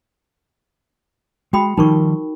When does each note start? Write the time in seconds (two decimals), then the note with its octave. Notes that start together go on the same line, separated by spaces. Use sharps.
1.53 G#3 F#4 G5 B5
1.77 D#3 F3 G3 D#4 A#4 C#6